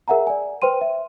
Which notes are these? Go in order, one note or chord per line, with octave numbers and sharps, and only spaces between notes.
G#4 A#4 E5 F#5 G#5 A#5
D5 G#5
B4 C5 G5 C6 D#7
E5